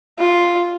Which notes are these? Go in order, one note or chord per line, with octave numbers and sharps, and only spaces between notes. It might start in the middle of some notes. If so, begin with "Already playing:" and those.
F4